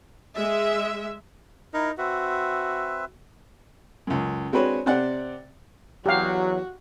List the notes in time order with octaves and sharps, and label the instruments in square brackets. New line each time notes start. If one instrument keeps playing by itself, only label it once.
[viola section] G#3 E5
[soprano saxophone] D#4 [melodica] E4 A#4
[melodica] C4 B4 E5 [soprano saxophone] F#4
[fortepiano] C#2 F#2
G#3 C4 D4 F#4 B4 C#5
C3 C4 D5 F#5
[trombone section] E2 F#3 [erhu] F#4 [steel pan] G4 F5